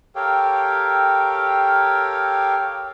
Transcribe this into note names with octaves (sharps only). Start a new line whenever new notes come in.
G4 A4 A#4 C#5 F5 G5